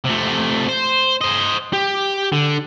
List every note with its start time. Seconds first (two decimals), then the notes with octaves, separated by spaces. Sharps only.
0.04 C3 A3
0.68 C5
1.21 C5 D#5
1.73 G4
2.32 D3